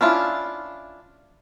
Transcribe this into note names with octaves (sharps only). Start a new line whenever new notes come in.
C#4 D4 E4 F4